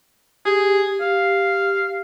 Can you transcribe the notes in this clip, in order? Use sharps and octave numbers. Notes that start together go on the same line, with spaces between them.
G4 G#4
G4 F5